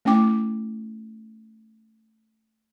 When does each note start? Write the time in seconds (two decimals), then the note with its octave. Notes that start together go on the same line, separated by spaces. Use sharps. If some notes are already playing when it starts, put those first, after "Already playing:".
0.05 A3 C#4 E4 G5 D6